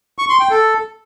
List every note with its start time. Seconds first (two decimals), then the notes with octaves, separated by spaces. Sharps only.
0.19 C#6
0.29 C6
0.40 G5
0.50 A4